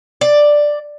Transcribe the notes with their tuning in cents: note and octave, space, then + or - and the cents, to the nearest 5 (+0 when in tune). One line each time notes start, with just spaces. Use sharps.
D5 +5